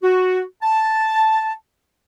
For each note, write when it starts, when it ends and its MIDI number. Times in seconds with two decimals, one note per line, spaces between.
0.03 0.42 66
0.63 1.53 81